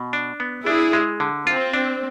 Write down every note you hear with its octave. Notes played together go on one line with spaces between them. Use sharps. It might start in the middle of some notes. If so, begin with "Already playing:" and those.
Already playing: B2
D4
B3
D4 E4 G#4
G#3
D3
C4 F4
D4